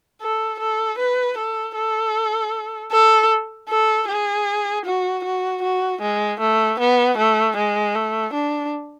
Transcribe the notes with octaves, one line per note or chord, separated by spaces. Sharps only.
A4
A4
B4
A4
A4
A4
A4
G#4
F#4
F#4
F#4
G#3
A3
B3
A3
G#3
A3
D4